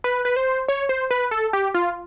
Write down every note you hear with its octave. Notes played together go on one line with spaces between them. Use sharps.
B4
B4
C5
C#5
C5
B4
A4
G4
F4